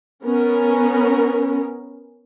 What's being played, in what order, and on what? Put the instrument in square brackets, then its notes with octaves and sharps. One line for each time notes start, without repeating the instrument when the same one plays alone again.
[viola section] B3 C#4 A#4